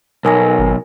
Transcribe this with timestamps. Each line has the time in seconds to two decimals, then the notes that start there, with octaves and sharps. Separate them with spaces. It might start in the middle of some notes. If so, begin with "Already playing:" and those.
0.25 B1 A#4 G#5 A#6
0.59 G#1